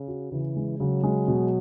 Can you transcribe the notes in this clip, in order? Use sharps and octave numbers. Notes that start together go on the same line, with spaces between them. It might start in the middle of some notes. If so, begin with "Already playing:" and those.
Already playing: C#3
F#4
C#3 E3
G#3
C#3 F#3
G#3
B2